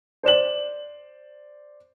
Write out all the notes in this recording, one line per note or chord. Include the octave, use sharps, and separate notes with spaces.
C5 D5 E7 F#7